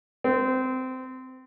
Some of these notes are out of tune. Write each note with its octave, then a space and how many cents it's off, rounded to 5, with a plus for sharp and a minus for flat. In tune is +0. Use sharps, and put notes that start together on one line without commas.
C4 -20